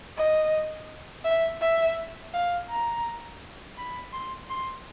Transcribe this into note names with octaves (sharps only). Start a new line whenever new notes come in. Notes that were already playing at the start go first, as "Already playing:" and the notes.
D#5
E5
E5
F5
A#5
B5
C6
C6